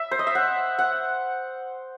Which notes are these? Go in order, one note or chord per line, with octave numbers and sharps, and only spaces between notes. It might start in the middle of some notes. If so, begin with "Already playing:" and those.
Already playing: E5
C5
D#5
E5
F#5
F#5